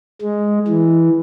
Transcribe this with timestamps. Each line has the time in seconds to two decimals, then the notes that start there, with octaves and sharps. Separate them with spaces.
0.21 G#3
0.68 E3